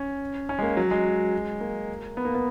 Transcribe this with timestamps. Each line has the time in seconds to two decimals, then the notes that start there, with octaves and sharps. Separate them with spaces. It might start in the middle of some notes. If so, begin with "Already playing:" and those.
Already playing: C#4
0.49 C#4
0.59 G#3
0.62 A#3
0.77 F#3
0.91 G#3
1.61 A#3
2.17 B3
2.25 A#3
2.35 B3